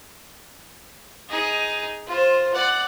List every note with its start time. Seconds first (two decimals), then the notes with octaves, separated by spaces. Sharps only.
1.29 D#4 G#4
2.07 F4 C5
2.53 D5 F#5